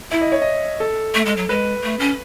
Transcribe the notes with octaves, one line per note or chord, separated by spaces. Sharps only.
E4 E5
D#5
C#5
D#5
A4
A3
G#3
F#3
G#3 B4
A3
C#4